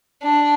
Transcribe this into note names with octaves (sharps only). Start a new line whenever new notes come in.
D4